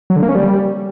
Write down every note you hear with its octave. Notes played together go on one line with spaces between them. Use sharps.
F#3
D3
A#3
C#4
G3